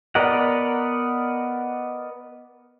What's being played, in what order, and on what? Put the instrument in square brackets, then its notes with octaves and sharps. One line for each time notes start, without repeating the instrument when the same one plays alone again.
[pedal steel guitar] B3 A#4 D5 D#5 F#5